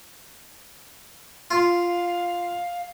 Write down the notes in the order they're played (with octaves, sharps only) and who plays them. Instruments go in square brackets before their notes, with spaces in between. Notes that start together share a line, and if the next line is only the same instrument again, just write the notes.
[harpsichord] F4 [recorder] F5